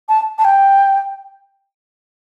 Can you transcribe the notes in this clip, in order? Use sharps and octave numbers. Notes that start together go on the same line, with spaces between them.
A5
A5
G5